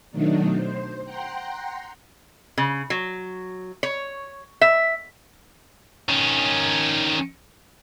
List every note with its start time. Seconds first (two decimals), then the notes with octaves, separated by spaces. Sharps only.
0.12 B2 D#3 F#3 A3 D4 D#4
0.55 C5
1.04 F#5 G5 A#5 C6
2.58 C#3
2.90 F#3
3.83 C#5
4.61 E5
6.09 D#3 C#4